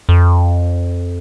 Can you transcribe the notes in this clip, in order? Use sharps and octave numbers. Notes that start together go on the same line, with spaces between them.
F2